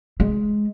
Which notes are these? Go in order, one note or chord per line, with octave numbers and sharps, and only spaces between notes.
G#3